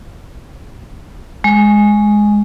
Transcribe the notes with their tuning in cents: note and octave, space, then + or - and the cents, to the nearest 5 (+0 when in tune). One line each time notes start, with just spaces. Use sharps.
G#3 +5